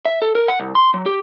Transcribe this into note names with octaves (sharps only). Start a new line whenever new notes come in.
E5
A4
A#4
F#5
C2
C6
F#3
G4